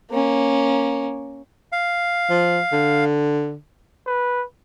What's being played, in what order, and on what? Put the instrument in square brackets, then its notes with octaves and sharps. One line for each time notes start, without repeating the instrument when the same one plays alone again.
[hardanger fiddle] A#3 C#4
[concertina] F5
[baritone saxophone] F3
D3
[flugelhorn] B4